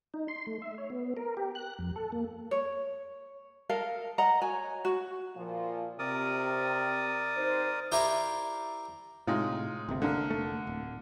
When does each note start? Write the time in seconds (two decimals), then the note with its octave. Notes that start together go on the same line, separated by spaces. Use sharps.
0.14 D#4
0.28 C6
0.47 A3
0.62 E5
0.78 C#5
0.90 B3
1.17 A#4
1.37 G4
1.55 F#6
1.79 F2
1.96 A4
2.12 A#3
2.51 C#5
3.69 A4 A#4 D#5 F5
4.18 D#5 F#5 A#5
4.42 F#4 C#5 G#5
4.85 F#4
5.36 A#2 F3
5.99 C3 A#4 D5 D#6
7.37 C3 D#4 C5
7.92 E4 G4 A#4 C5 D5 F5
9.27 A2 C3 G#3 D#4 F4
9.88 G#1 D2 C3
10.02 D3 A#3
10.30 F1 A3
10.67 D1